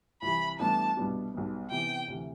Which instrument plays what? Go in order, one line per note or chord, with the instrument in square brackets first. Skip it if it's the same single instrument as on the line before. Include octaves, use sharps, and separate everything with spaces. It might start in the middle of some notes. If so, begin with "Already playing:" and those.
[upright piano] C2 C3 E3 [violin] B5
[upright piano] A1 A2 G3 B3 D4 [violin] A5
[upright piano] C2 B2 G3 B3 D4
B1 B2 G3 B3
[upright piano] C3 E3 B3 E4 G4 [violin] G5
[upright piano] D2 C3 E3